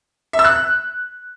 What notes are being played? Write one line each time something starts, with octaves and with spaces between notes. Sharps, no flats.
E5
E6
F#6